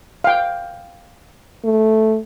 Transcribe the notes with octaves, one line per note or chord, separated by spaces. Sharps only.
F5 G5
A3